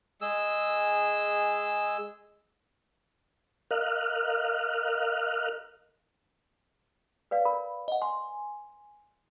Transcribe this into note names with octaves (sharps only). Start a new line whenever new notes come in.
G#3 G#4 E6
A#4 D#5 F5 F6 F#6
B4 D5 F5
A#4 B5
D#5 F#5
G#5 C6